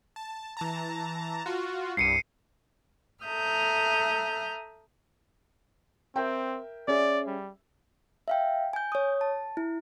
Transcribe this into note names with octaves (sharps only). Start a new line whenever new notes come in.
A5
E3 A5 A#5
F4 F#4
C2 G2 C7 C#7 D#7
A4 E5 A#5 D#6 F6 G6
C4 A#4 E5 G5
C#4 G#4 D5 E5
G3
E5 F5 G5
G#5 G6
C#5 D#6
A5
E4